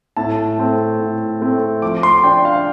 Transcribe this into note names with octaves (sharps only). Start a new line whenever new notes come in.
A2 A5
A3 C4
A2
A3 C4
F3 D6
C6
D4 G5
F5